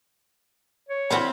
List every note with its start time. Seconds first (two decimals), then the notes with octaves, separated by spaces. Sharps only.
0.89 C#5
1.10 D3 E3 C4 F#4 C5 F5 B5